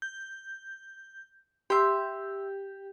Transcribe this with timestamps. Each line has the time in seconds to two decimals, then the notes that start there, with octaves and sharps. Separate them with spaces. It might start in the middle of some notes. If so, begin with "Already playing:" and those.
0.02 G6
1.70 G4 E5 C6